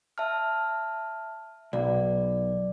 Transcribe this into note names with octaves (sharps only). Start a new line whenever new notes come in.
E5 A5 F6
B1 D5